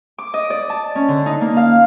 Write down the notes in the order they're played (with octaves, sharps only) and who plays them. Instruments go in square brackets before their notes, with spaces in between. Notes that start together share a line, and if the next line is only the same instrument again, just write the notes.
[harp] D6
D#5
D5
A5
C#4
D3
D#4
A#3
F5